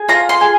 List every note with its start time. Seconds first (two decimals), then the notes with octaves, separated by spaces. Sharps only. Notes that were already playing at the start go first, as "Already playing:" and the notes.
Already playing: G#4
0.09 F4 A#5
0.29 C6
0.41 G#4